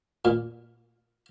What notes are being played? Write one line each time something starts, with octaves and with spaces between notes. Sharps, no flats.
A#2